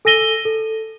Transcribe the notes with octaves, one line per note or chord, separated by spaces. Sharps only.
A4 G#5 E6 A#6 D#7 G7
A4